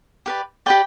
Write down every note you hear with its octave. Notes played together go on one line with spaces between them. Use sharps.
G4 B4 D5
G4 B4 D5 G5